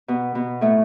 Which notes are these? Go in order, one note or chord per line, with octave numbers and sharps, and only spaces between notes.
B2 B3
B2 B3
A2 A3